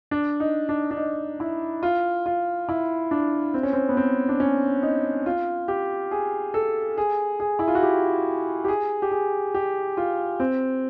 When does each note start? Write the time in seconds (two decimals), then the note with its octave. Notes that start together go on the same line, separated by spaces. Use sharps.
0.11 D4
0.40 D#4
0.69 D4
0.91 D4
0.97 D#4
1.40 E4
1.83 F4
2.26 F4
2.69 E4
3.11 D4
3.54 C4
3.63 C#4
3.73 C4
3.89 B3
3.97 C4
4.29 D4
4.40 C#4
4.83 D#4
5.26 F4
5.68 G4
6.11 G#4
6.54 A4
6.98 G#4
7.40 G#4
7.59 E4
7.68 F4
7.75 F#4
7.83 G4
8.64 G4
8.68 G#4
9.02 G4
9.11 G#4
9.54 G4
9.97 F4
10.40 C4